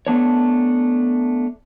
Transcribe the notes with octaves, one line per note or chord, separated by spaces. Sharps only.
A3 B3 D4 C#5